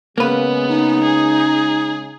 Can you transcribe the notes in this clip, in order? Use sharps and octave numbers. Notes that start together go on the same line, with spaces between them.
C#3 G#3 A#3 B3 B4
D#4
G#4